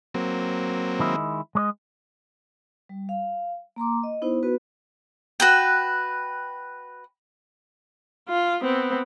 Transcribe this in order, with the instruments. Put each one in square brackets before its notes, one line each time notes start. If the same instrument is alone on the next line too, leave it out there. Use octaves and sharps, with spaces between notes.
[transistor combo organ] F#3 A#3 C4
[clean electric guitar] D#3 G#3 E4
G#3 D5 D#5
[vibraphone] G3
F5
A#3 A#5 C6 D6
D#5
B3 D#4 E4 C5
B3 F#4 B4
[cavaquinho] F#4 B4 G5
[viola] F4
B3 C4